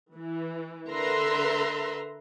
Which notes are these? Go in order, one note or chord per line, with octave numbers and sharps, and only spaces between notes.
E3
D3 A#4 B4 E5 A#5 C6